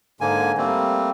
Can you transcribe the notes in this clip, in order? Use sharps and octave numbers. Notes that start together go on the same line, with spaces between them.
G#2 D3 A#3 G#5
G3 A3 A#3 C4